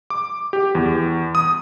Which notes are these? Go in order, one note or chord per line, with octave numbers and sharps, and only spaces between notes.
D6
G4
E2
D#6